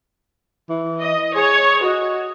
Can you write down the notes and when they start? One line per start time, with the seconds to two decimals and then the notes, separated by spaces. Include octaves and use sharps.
0.69 E3
1.00 D#5
1.35 G#4 C#5
1.84 F#4 D#5